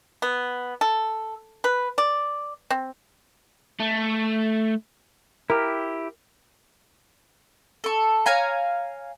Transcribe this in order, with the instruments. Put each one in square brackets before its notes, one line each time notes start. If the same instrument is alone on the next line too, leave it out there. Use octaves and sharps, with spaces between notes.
[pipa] B3
A4
B4
D5
C4
[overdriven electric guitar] A3
[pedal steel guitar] E4 G4 [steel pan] A#4
[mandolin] A4 C#6
C#5 F5 G#5 A#5